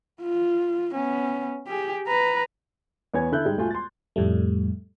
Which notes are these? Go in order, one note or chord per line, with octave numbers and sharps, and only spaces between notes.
F4
B3 C#4
G4 G#4
B4 A#5
E2 B3 C#5 G#5 G#6
D3 E4 A4 F#6 G6
G#2 G3 G#3
E1 A3 F4 G#5
C6 A6
F2 A2 G3 A3